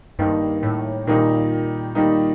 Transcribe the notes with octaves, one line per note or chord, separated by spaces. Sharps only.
G2 D#3 G3 A#3 D#4
A2
A#2 D#3 G3 A#3 D#4
D#3 G3 A#3 D#4